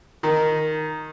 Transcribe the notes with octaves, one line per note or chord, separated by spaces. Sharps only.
D#3